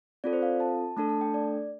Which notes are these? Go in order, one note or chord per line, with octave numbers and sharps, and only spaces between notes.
C4 F4 A4 D5
C5
F5
A5
A3 D4 A4 A5
A5
G5
D5